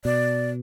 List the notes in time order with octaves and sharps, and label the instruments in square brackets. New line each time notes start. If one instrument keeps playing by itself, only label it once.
[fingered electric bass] B2 [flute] D5